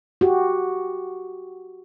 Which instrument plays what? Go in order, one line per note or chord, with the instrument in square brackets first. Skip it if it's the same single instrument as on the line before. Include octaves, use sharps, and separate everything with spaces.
[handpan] F#4 G4